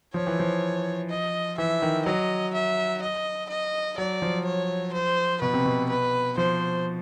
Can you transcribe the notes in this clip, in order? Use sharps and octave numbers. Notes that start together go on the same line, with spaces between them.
F3 C#5
E3
F3
D#5
E3 E5
D#3
F#3 D#5
E5
D#5
D#5
F#3 D5
F3
C#5
C5
B2 B4
C3
B2
B4
F3 C5